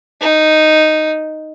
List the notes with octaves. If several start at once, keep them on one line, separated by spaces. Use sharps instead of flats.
D#4